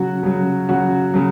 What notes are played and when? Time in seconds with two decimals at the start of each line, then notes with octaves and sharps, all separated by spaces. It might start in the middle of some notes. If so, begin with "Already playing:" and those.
Already playing: C#3 F#3 F#4
0.23 C#3 F#3
0.69 C#3 F#3 F#4
1.14 C#3 F#3